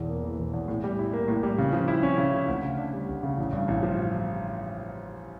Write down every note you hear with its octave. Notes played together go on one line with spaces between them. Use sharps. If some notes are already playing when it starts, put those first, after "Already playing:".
Already playing: E1 E2
A#3
E3
E1
E2
A2
G3
E4
A#3
A2
G3
C#3
F3
E4
C#4
C#3
F3
D2
C#3
D4
G3
D2
C#3
A1
G2
A1
F3